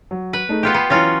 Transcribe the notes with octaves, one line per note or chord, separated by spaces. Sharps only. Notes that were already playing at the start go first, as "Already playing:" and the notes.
F#3
B4
A3 D#4 G#4
B3 F4 G4
B3 B5 C7
E3 F#3 C#4 F4 A6